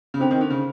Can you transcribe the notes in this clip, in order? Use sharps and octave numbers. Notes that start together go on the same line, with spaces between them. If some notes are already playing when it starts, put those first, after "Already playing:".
C#3
D3 C4
D#3
D3
C#3